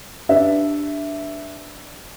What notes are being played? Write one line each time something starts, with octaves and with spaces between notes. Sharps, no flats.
D4 G4 B4 E5